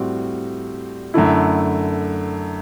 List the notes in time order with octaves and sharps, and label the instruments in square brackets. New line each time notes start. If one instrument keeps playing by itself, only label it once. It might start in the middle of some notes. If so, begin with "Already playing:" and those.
Already playing: [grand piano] A2 G3 C4 F#4
F#2 D3 A3 E4